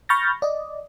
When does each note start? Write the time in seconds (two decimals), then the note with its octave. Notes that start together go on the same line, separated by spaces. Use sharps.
0.09 B5 C#6 F6 G6 A6 A#6
0.42 D5 D#5